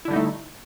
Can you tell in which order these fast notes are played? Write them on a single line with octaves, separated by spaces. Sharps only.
E4 D3 G3 D#4 A3